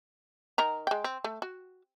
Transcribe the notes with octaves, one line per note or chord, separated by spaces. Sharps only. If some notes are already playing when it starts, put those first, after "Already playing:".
D#3 A#4 A#5
G#3 G5
C4
A3
F#4